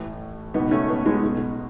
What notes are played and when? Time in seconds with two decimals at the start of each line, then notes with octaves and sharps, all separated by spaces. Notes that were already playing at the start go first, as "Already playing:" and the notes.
Already playing: A1 A2 E3
0.54 C#2 B2 B3 D#4
0.71 A3 C#4
0.89 B3 D#4
1.06 G#3 B3
1.23 B1 B2